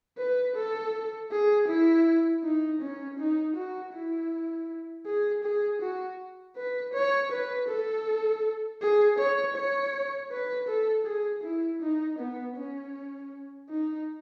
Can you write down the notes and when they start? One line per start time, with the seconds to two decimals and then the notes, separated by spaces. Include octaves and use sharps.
0.18 B4
0.56 A4
1.31 G#4
1.68 E4
2.43 D#4
2.81 C#4
3.19 D#4
3.56 F#4
3.94 E4
5.06 G#4
5.44 G#4
5.81 F#4
6.57 B4
6.93 C#5
7.31 B4
7.68 A4
8.81 G#4
9.19 C#5
9.56 C#5
10.31 B4
10.68 A4
11.06 G#4
11.43 E4
11.82 D#4
12.18 B3
12.57 C#4
13.69 D#4